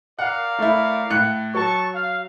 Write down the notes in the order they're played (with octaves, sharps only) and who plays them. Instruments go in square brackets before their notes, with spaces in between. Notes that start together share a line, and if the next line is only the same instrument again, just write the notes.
[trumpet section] A#4 D5 F5 [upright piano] F#5
[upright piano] A3 E4
A2 F#6 C#7
[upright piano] F#3 [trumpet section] A5 C#6
[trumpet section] F5